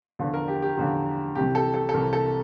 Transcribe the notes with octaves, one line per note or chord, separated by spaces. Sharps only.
E2 D3 F3
A#4
G4
G4
E2 D3 F3
C2 C3 E3 G4
A4
A4
A4
C2 C3 E3 A#4
A4